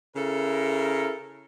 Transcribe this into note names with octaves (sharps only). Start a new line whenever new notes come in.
C#3 E4 A4 A#4